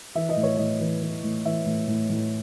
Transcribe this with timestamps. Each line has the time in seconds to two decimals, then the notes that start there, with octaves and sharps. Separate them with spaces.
0.15 E3 E5
0.29 D#5
0.37 A2
0.43 C#5
0.56 A2 D#5
0.80 E3
1.02 E3
1.24 A2
1.45 E3 E5
1.66 A2
1.88 A2
2.10 A2